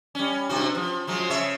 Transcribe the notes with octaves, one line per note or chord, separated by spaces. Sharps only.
G3 C#4
G2 C3 F#4
F3
F3 F#3 G#3
C#3 C#5 E5